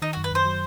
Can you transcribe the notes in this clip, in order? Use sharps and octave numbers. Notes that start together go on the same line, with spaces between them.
D#3 D#4
F#4
F#2
B4
F#2 C5
F#3